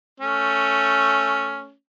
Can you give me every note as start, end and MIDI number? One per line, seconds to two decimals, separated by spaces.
0.20 1.72 57
0.20 1.72 61